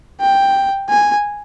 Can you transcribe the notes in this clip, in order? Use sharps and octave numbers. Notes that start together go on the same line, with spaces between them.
G5
G#5